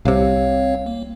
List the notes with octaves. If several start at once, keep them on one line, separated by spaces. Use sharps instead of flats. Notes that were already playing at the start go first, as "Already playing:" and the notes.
C2 C3 C4 C#5 F5
A#3